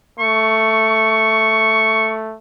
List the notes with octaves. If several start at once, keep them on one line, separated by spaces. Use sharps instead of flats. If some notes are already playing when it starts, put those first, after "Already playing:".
A3 C#6